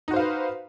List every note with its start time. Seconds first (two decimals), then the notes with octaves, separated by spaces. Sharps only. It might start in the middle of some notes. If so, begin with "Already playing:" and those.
0.08 D#4
0.11 F#4
0.13 C5
0.16 F5
0.19 B4